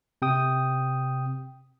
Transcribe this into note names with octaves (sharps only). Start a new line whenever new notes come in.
C3 G5 D#6